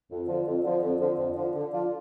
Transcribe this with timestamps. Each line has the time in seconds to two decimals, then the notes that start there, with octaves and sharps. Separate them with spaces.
0.11 F2
0.28 D3 F3
0.47 F2
0.64 D3 F3
0.83 F2
1.00 D3 F3
1.19 F2
1.36 D3 F3
1.55 D3
1.73 F3 D4 F4